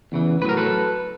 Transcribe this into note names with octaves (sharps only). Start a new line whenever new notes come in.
E2 C#3 E3
A2 F#3 A#4 B4
A4 B4